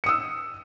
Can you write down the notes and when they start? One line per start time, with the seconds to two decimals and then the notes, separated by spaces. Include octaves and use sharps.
0.04 C#7
0.06 D#6
0.09 E6